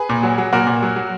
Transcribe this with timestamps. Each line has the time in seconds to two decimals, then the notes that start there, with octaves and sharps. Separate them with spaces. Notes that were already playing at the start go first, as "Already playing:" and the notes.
Already playing: G#4 B4
0.09 A#2
0.23 F#3
0.38 F#3
0.53 A#2 F#4 A#4
0.67 A#2
0.82 F#3
0.96 F#3